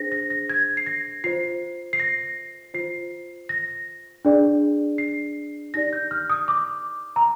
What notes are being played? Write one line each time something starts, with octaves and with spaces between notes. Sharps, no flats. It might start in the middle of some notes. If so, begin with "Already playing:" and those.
Already playing: D4 G#4 C5 A#6
A#6
A#6
G#6
C7
A#6
F4 C5 C7
C7
A#6
F4 C5 C7
A#6
D4 G#4 D5
C7
D#4 G4 D5 A#6
G6
F6
D#6
D6
A#5